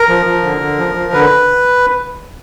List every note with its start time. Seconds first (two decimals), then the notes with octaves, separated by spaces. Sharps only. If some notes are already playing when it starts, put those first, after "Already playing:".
Already playing: A#4
0.09 F3
0.26 F3
0.43 D3
0.61 D3
0.78 F3
0.95 F3
1.13 D3 B4